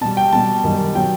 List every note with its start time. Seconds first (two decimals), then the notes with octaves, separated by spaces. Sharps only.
0.01 B2 A5
0.05 G3
0.17 G5
0.33 B2 G3 A5
0.64 F#2 D#3 G3
0.95 B2 F#3 G5